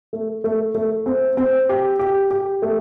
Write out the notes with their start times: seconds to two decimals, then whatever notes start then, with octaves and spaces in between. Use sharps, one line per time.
0.13 A3
0.44 A3
0.75 A3
1.06 C4
1.37 C4
1.69 G4
1.99 G4
2.31 G4
2.62 A3